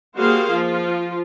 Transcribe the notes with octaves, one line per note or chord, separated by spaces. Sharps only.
G3 A#3 F#4 G#4 C5 F5
F3 F4